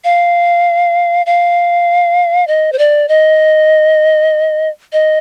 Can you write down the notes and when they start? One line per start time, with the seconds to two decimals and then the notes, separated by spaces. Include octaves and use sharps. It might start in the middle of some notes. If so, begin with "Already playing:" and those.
0.04 F5
1.26 F5
2.47 D#5
2.72 C5
2.79 D5
3.08 D#5
4.93 D#5